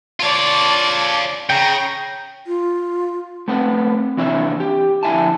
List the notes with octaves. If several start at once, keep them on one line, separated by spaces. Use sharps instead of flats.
F4 C#5 D5 A5
C#3 G5 A#5
F4
A3 B3 C4 F#5
D#2 C3 E3 D4 C#5 E5
G4
F2 D3 E4 E5 G#5 A5